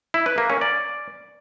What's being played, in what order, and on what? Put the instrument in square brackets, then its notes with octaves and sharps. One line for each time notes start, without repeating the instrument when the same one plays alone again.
[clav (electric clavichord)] E4
B4
A#3
C#4
D5